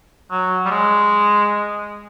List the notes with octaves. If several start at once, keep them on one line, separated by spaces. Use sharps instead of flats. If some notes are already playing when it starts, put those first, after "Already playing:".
F#3
G3
G#3